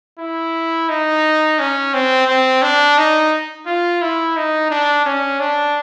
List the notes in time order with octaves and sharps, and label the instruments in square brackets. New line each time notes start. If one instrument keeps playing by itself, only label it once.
[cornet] E4
D#4
C#4
C4
C4
D4
D#4
F4
E4
D#4
D4
C#4
D4